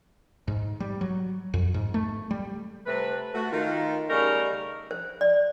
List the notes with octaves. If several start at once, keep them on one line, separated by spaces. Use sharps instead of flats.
G#2
G3
F#3
F2
G#2
A3
G3
C3 A3 C4 B4
A3 F#4
D#3 F4
C#3 G3 A3 D#4 A#4
C5
D5